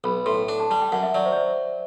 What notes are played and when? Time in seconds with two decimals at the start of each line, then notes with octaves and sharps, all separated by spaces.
0.04 B1 B5
0.26 A2 C6
0.49 D4
0.60 A5
0.70 G3 A5
0.82 G5
0.92 F#2 F#5
1.03 E5
1.15 F#3 D5
1.26 C5
1.33 D5
1.36 C5